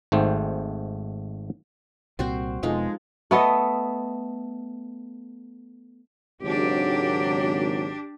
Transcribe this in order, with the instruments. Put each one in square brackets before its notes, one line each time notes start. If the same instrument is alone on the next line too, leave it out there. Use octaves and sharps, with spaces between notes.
[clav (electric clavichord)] G#1 G#2 A3 C5 G5
[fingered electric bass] C2 A#2 G3 [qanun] C4 F#4 C5
[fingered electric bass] E1 B2 [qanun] F3 D#4 A4 [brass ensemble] G#3
[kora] A3 B3 A4 D#5
[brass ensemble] G#1 C#3 F#3 [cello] D4 G4